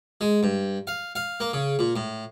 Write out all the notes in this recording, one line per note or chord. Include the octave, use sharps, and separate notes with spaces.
G#3
G2
F5
F5
A#3
C#3
A#2
A2